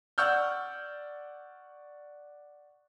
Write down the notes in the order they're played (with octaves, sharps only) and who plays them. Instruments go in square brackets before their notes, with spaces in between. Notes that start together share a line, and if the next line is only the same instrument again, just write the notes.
[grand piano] D5 F#5 C#6 E6 F6 G6